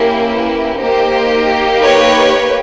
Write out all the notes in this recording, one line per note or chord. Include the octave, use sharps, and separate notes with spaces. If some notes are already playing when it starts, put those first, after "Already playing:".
Already playing: A#3 C#4 E4 G4
B4
A#3 D#4 G4 C5
B4 C#5